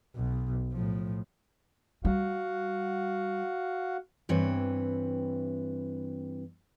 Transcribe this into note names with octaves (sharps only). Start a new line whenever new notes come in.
B1 B2
A2 F3
G3 F#4 F5 F#5
G2 E3 C4 B4 C#5